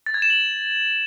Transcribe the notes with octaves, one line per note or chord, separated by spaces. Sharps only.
A6
G#6
E7
F#7